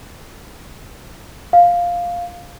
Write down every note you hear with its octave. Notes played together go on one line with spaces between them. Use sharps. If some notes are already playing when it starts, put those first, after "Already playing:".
F5